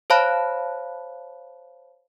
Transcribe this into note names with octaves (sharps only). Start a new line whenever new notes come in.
C5 C#5 F5 A5 B5 F#6